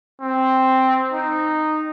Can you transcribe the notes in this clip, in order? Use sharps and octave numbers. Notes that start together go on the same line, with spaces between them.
C4
D#4